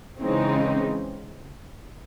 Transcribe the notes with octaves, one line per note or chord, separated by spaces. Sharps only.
C#3 E3 G#3 C4 D#4